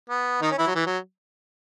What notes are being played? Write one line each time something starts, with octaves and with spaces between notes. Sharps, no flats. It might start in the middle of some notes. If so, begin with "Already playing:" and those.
B3
D#3 D#4
C#4
E3 E4
F#3
E3
F#3